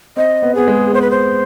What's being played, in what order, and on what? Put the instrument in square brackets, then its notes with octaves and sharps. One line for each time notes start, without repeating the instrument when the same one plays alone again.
[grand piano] C4 [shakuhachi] D#5
[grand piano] B3
[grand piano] B3 [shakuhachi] G#4
[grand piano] G#3
[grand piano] B3 [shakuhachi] C5
[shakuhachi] B4
C5